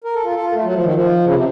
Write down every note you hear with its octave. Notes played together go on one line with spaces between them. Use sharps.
A#4
A4
F4
A4
F4
A3
F#3
F3
D#3
F3
C#3
C3